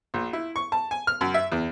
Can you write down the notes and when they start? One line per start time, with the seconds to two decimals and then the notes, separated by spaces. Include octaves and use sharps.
0.14 A#1
0.33 E4
0.56 C#6
0.72 A5
0.91 G#5
1.07 F6
1.21 F#2
1.34 E5
1.52 E2